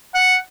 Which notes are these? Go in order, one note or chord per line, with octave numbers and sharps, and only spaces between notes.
F#5